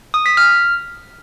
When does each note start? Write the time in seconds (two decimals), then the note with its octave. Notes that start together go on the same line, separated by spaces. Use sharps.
0.14 D#6
0.26 B6
0.37 F6